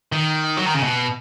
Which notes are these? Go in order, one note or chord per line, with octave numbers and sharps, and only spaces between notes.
D#3
F#3
D#3
C#3
B2